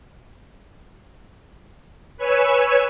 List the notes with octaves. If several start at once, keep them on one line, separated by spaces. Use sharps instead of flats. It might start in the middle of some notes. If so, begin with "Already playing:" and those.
B4 C#5 G#5 E6